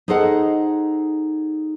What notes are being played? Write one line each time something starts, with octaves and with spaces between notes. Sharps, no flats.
D#4 G#4 A4 C5 D#5 F#5